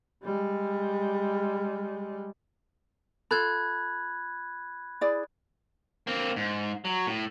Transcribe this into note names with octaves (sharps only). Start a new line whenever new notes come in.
G3 G#3
F4 A4 B5 F#6 G#6
E4 G#4 D5
A#3 C4
G#2
F#3
A2